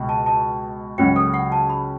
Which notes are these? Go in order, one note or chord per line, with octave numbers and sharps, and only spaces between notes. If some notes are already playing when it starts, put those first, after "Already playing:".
Already playing: C#2 B2
A5
A5
C#2 C#3 F#3 C#4 F#4 G5
A4
F#5
A5
B5